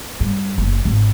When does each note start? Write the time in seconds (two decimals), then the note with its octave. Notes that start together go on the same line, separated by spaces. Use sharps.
0.20 G2
0.58 F#1
0.85 G#1